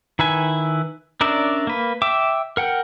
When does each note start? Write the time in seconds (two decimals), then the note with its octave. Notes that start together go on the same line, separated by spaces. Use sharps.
0.19 D#3 E4 B4 G#5
1.21 C#4 D4 A#4 D5 E5
1.67 A#3 B4
2.02 E5 G5 D6
2.57 A#4 F#5 G5